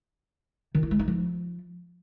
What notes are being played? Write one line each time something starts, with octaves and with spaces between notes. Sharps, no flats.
D#3
E4
G#3
D#4
F3